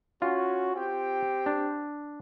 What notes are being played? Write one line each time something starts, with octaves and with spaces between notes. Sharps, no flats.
C#4 F4 F#4
C4 G4 G5
D4